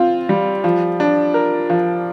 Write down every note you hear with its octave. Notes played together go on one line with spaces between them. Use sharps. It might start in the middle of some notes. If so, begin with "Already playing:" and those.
Already playing: C4 F4
G3
F3
D4
A#4
F3